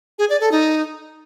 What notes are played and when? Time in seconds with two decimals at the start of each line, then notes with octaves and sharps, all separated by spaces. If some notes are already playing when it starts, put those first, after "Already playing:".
0.19 G#4
0.30 D5
0.41 A4
0.52 D#4